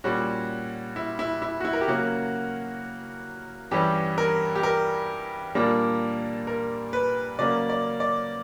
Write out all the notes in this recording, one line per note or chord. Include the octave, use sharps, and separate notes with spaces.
A#2 G3 C#4 F#4
E4
E4
E4
F#4
E4
A#4
G4
C#3 F#3 A#3 C#4 F#4
G2 E3 G3 C#4 G4
A#4
G4
A#4
A#2 G3 A#3 D4
A#4
B4
C#3 F#3 A#3 C#4 D5
D5
D5